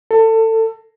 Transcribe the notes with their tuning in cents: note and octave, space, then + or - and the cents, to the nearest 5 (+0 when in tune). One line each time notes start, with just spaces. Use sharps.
A4 +25